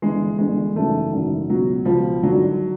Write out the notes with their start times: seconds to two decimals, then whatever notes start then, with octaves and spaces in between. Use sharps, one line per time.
0.02 G1 G2 E3 G#3
0.38 G1 G2 E3 G#3
0.75 G#1 F#2 C#3 E3 A3
1.12 G#1 F#2 C#3 E3
1.50 C#2 B2 F#3
1.85 C#2 B2 F3
2.23 G#1 G2 D3 F#3